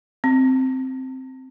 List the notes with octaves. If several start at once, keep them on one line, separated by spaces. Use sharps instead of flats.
C4